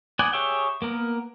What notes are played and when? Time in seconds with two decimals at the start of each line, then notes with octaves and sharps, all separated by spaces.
0.19 B3 D5 F#5 G#5
0.33 G4 G#4 C#5 E5 G5
0.82 A#3 B3 A#4